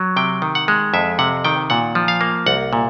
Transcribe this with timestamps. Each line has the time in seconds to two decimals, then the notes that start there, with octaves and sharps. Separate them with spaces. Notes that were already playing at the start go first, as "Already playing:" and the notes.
Already playing: F#3
0.16 C3 G5
0.42 D#3
0.55 F#5
0.68 G#3
0.94 F2 E5
1.19 C3 F#5
1.45 D#3 G5
1.70 A#2 F#5
1.95 F3
2.08 F5
2.21 A#3
2.46 C2 F#5
2.73 A#2